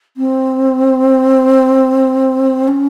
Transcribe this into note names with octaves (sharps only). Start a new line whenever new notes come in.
C4
C#4